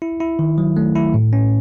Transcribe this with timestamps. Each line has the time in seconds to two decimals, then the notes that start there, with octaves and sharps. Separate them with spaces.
0.02 E4
0.20 E4
0.39 D#3
0.58 F#3
0.76 A3
0.96 E4
1.14 A2
1.33 C#4